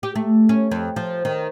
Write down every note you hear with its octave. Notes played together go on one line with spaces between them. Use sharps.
G4
A3
C#4
F2
F3
D#3